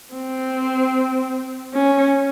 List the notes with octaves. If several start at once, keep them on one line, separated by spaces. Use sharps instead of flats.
C4
C#4